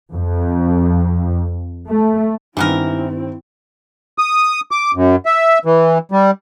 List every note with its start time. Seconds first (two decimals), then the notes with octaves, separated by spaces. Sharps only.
0.12 F2
1.88 A3
2.57 G2 D#3 E3 B3 C4 E4 A#4
4.18 D#6
4.71 D6
4.95 F#2
5.26 E5
5.65 E3
6.12 G3